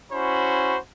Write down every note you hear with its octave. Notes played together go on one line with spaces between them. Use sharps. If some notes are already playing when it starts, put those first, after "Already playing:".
C#4 E4 F#4 C5 B5